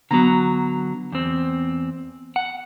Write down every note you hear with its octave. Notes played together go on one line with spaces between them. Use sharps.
D3 F#3 B3 A#5
E2 C4
F#5